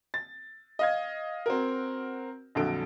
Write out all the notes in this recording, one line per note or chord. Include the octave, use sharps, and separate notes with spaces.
A6
D#5 F5 G#6
C4 F#4 A#4
A#1 F2 D3 F#3 A4 D7